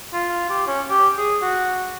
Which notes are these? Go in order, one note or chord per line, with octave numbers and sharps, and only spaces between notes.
F4
G4
C#4
G4
G#4
F#4